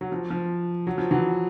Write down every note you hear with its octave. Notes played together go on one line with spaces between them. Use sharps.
F#3
F3
F3
F#3
F3
E3 F#3